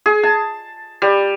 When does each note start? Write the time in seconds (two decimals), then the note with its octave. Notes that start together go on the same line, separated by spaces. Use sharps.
0.06 G#4
0.23 A5
1.02 G3